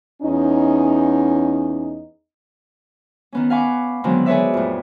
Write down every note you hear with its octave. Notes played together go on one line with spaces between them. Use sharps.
E2 C#4 D#4
D#3 B3 C#4
F5 F#5 G#5 B5 C#6 D6
D3 D#3 F#3 G#3 B3 C4
G#4 B4 C#5 D5 E5
F2 A2